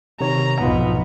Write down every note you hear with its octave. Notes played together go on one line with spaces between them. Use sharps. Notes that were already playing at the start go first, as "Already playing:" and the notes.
C3 D#3 C#5 A#5
B1 F2 G#2 B3 F4 D#5